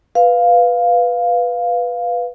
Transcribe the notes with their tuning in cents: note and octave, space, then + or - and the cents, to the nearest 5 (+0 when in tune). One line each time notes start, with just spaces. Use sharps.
B4 +0 F5 +0